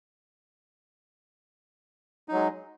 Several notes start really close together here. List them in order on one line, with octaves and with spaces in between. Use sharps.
D#4 F#3 G#3